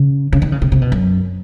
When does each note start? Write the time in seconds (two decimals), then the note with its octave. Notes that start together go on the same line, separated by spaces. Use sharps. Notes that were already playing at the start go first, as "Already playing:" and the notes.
Already playing: C#3
0.33 C#3
0.42 D#3
0.52 C#3
0.62 C3
0.72 C3
0.82 B2
0.92 F#2